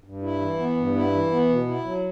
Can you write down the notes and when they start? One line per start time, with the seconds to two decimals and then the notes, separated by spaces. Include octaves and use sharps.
0.04 G2
0.22 E4
0.40 E3
0.59 B3
0.77 G2
0.95 E4
1.13 E3
1.31 B3
1.49 B2
1.67 E4
1.84 F#3